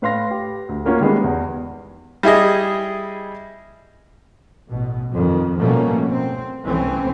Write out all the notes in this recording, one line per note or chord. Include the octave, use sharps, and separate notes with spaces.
A2 B4 F5 C6 A#6
G4
D2
A#3 C#4 F4 F#4 A#4
D#3 G3 G#3 B3
E2
G3 E4 G#4 D#5
A1 B2
F2 D#3
B2 F3 G3 A3 A#3 C#4
C4
C2 E3 A3 C4 C#4